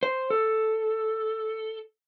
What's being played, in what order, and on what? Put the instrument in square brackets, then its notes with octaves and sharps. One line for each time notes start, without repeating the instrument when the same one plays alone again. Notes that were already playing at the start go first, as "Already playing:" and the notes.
[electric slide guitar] C5
A4